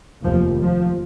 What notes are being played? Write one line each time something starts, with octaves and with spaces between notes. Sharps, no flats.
F1 D#2 F3
F3